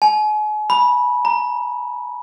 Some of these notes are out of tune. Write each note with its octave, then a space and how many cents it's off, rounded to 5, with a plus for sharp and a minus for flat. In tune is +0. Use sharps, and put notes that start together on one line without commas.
G#5 +40
B5 -20
A#5 +0